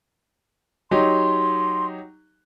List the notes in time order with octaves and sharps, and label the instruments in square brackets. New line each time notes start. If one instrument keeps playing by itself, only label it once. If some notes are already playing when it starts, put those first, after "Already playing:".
[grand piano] F#3 D#4 G4 [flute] C6